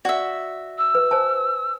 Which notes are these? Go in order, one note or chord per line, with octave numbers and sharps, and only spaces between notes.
F#4 D5 E5
E6
B4
C5 G#5 A5